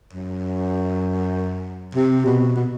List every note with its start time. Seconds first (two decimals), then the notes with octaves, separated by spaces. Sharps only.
0.13 F#2
1.95 C3
2.25 B2
2.56 B2